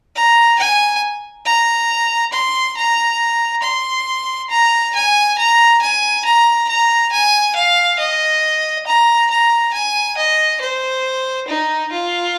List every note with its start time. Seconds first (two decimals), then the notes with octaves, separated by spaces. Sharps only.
0.16 A#5
0.59 G#5
1.46 A#5
2.32 C6
2.76 A#5
3.63 C6
4.50 A#5
4.95 G#5
5.38 A#5
5.81 G#5
6.25 A#5
6.69 A#5
7.12 G#5
7.56 F5
7.99 D#5
8.87 A#5
9.30 A#5
9.73 G#5
10.17 D#5
10.61 C5
11.48 D#4
11.91 F4